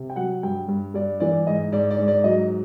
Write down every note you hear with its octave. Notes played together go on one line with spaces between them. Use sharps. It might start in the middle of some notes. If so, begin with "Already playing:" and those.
Already playing: C3
G5
F#3 F#5
G2 G5
G2
G2 D5
E3 D5
G#2 D#5
G#2 D5
D5
G#2
D5
F#3 D#5